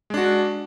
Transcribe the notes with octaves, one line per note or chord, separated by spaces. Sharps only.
G#3 D4 F#4